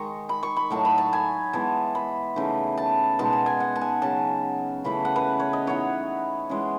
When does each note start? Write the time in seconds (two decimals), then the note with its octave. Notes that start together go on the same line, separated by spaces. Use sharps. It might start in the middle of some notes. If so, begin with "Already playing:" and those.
Already playing: D#3 G#3 D#4 C#6
0.29 B5
0.43 C#6
0.57 B5
0.70 A2 F#3 A3 D#4 A5
0.85 B5
0.98 A5
1.13 G#5
1.53 E3 G#3 B3 A5
1.95 B5
2.36 C#3 E3 A3 D#4
2.78 A5
3.19 B2 G#3 D#4 A5
3.33 G#5
3.46 G#5
3.60 F#5
3.76 A5
3.81 G#5
4.02 C#3 F#3 C#4 A5
4.84 C#3 E3 A3 B5
5.05 F#5
5.16 B4
5.40 C#5
5.53 D#5
5.67 E3 B3 D#4 C#5
6.49 E3 G#3 C#4